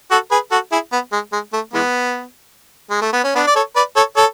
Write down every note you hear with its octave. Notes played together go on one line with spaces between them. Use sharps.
F#4 A4
G#4 B4
F#4 A4
E4 G#4
B3
G#3
G#3
A3
E3 G#3 B3
G#3
A3
B3
C#4
B3 D4
D5
A4 C#5
B4 D5
A4 C#5
A4 C#5